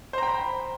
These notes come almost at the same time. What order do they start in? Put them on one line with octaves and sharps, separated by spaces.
C5 A#5 G5 B5